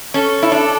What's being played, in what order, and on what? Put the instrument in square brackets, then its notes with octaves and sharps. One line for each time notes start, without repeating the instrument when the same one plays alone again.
[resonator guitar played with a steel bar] C#4 [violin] A4
[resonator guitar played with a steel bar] E4
D4